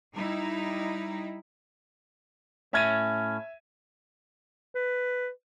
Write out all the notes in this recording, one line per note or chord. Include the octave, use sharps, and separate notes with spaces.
G3 D#4 E4
A2 C#4 E5 G#6 D#7
B4